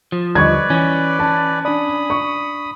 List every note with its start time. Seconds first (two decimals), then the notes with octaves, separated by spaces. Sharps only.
0.12 F3
0.35 D#2 D3 G3 B4 D5 D#5 C#6 G#6
0.70 E3 C#4 D6
1.19 A5
1.65 D4 D5 B5 D#6
2.10 C#6